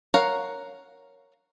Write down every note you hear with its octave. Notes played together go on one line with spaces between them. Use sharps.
A#4 C#5 F5 F#5 A#5